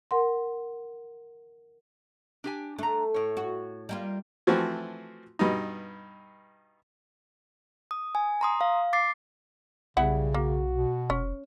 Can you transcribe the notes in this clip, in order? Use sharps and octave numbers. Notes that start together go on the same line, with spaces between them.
A#4 F#5 C6
D4 G4 G#5
A3 D4 A#5
A2 C#5
F#4
G3 A#3 F4
E3 F3 A3 C4 F#4
G2 B2 D#4
D#6
G#5
A#5 C6 D#6
F5
D6 A6 C7
B1 C#3 G3 B3 E4 F#5
A#3 F#4
B2
F1 C#4